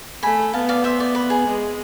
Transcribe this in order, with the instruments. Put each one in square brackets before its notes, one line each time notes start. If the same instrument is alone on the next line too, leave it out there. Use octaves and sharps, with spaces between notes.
[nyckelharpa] A3 [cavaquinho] G#5 B5
[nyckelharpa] B3 [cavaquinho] F5 A5
[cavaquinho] D5 F5
C5 E5
D5
B4
G#4
[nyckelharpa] G#3